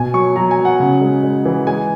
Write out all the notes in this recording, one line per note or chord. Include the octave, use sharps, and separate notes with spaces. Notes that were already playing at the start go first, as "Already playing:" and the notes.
Already playing: B2 G#5
F#3 C#6
F#3 A#5
G#5
F#3
F#5
C#3
G#3
G#3
E3
G#3 G#5